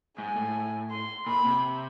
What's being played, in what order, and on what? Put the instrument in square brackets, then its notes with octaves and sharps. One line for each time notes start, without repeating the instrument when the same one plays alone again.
[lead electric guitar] G#2 [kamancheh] G#5
[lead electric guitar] A2
[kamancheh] C6
[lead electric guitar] A#2 [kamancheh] B5
[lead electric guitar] C3